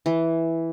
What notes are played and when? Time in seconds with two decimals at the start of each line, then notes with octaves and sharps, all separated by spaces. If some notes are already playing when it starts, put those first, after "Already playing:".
0.06 E3